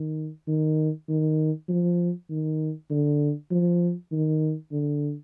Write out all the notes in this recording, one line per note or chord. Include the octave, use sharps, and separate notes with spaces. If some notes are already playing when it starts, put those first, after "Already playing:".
Already playing: D#3
D#3
D#3
F3
D#3
D3
F3
D#3
D3